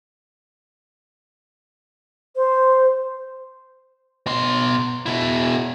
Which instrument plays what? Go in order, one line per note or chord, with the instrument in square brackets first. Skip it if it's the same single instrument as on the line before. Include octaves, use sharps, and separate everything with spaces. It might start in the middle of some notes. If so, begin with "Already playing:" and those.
[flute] C5
[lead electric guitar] B2 C6
B2 E4